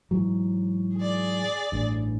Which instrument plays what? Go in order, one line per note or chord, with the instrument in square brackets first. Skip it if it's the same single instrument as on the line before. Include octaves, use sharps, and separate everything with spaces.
[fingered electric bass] G#2 E3 F#3
[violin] G#4 D5
[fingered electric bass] A1 G2